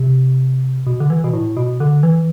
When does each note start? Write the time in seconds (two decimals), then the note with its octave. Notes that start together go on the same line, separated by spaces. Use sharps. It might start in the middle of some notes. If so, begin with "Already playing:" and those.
Already playing: C3
0.87 B2
1.00 D3
1.10 E3
1.24 B2
1.33 A2
1.57 B2
1.80 D3
2.03 E3